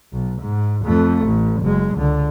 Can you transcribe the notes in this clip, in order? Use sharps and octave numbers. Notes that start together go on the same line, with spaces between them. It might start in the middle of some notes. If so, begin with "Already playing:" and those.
B1
G#2
F2 A3
A1
F#1 G#3
C#2 D3